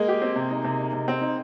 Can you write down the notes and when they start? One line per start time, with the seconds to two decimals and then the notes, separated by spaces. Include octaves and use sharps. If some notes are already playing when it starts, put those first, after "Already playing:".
Already playing: G#3 A#3
0.08 G4
0.22 C4
0.36 C3
0.51 D#4
0.64 C3
0.79 D#4
0.93 C3
1.08 C4
1.21 D#4